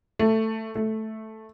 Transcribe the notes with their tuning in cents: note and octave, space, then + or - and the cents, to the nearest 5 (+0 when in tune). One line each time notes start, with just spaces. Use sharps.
A3 +10
A3 -5